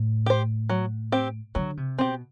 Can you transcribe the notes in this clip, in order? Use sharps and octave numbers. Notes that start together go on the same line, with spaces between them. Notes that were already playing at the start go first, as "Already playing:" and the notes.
Already playing: A2
G4 C5
F#3
C4 G4
D3 F#3
C3
B2 C4 G4